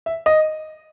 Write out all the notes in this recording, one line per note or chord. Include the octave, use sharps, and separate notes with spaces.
E5
D#5